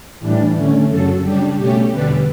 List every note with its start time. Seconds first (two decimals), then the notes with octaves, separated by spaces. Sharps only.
0.20 A2 E3 G3 D4
0.54 D3 A3 C#4
0.89 F#2 C#3 F#3 A4
1.23 C#3 G3 D4 G4
1.57 B2 A3 C#4 G4
1.91 E2 D3 G3 B4